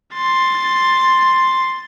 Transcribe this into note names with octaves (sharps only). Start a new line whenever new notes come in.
C6 A6